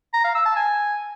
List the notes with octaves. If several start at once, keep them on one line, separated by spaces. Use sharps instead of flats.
A#5
F5
E6
A5
G#5